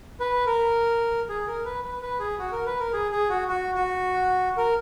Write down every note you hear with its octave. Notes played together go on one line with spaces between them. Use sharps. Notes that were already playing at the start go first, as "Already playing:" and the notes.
B4
A#4
G#4
A#4
B4
B4
B4
G#4
F#4
A#4
B4
A#4
G#4
G#4
F#4
F#4
F#4
A#4